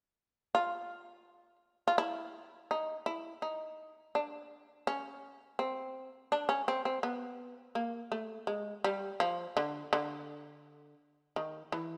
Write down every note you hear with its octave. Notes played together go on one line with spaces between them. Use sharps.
F4
F4
E4
D#4
E4
D#4
D4
C#4
C4
D4
C#4
C4
C4
B3
A#3
A3
G#3
G3
F3
D3
D3
D#3
E3